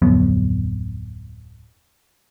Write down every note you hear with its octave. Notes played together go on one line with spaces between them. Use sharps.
D1 F2 F#3 B3